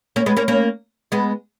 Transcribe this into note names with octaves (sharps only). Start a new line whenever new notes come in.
A#3 C#4
G#3 B3
A#3 C#4
A#3 C#4
G#3 B3